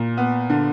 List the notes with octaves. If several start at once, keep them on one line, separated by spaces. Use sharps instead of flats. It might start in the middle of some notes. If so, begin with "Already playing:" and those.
Already playing: A#2
B3
D3